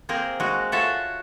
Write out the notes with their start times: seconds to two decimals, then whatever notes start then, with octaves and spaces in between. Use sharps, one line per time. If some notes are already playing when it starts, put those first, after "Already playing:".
0.09 A#3 C4 G#4 A#4
0.40 G#3 F#4
0.72 F4 F#4 A4 C#5 E5 F#5